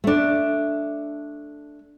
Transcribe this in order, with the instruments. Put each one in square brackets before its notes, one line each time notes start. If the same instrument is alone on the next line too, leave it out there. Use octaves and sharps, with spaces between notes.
[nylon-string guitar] A3 D4